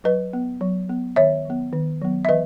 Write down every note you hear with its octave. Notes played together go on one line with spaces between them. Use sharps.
F#3 B4 D#5
B3
F#3
B3
D#3 C#5 E5
F#3 B3
D#3
F#3 B3
E5
E3 B4 D#5